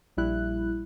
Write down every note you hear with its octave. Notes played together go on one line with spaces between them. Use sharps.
A#1 G3 E4 F#6